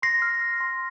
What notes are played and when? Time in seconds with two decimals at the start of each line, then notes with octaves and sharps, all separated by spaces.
0.02 C6 A#6 C7
0.22 F6
0.41 F6
0.60 C6